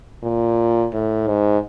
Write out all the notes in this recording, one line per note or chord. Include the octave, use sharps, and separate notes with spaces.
A#2
A2
G#2